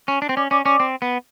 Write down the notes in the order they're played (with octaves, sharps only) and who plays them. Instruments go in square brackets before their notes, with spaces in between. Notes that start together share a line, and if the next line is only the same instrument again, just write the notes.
[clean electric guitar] C#4
D4
C4
[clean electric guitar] C#4 [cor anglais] D5
[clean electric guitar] C#4 [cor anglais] D5
[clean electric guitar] C#4 [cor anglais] D5
[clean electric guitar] C4
B3